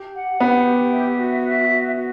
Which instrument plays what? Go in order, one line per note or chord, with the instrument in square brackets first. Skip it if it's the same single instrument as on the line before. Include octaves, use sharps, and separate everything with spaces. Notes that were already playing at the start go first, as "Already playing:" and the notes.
Already playing: [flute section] G4
F#5
[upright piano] B3 [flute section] G4
[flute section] G4
E5
F#4
E5
F#4
F#4